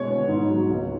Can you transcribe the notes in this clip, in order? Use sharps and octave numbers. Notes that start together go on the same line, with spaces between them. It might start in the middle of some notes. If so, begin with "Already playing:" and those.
Already playing: B2 G#3 C#5
B3
G#2
F#3
C#2